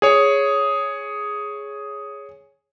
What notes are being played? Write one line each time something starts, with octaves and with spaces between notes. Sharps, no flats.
G#4 C#5